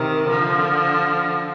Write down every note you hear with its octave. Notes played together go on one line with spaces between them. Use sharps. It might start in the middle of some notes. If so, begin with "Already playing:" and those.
Already playing: C3 D#3
D3 F3